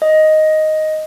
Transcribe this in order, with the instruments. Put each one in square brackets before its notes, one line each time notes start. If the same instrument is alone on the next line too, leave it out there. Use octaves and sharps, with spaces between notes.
[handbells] D#5